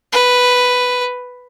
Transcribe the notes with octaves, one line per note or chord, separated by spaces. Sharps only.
B4